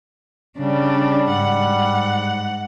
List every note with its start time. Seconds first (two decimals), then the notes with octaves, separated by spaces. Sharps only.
0.58 C#3 G3 D4
1.32 G#2 F#5